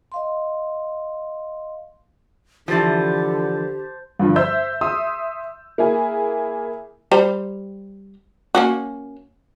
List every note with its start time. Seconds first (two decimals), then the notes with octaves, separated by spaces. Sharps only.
0.12 D#5 F5 C6
2.68 D3 E3 F3 G4 C5 A5
4.19 G2 D3 F3
4.36 C5 E5 E6 G6
4.81 E5 C6 D#6 E6
5.78 A#3 E4 G#4
7.12 G3 C5 A#5
8.55 A#3 C#4 F#4